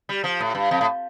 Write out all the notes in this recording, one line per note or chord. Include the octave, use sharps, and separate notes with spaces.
G3
F3
A2
G2
F2
A2